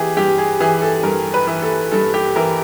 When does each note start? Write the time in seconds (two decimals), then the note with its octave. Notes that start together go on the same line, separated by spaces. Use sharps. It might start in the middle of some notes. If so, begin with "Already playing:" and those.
Already playing: E3 G4 G#4
0.17 G2 G4
0.38 G#4
0.60 E3 G#4
0.82 A4
1.03 G2 A#4
1.34 B4
1.47 E3
1.62 A4
1.91 G2 A4
2.14 G4
2.36 E3 A#4